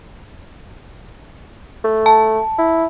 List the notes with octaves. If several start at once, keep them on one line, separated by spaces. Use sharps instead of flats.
A3
A5
E4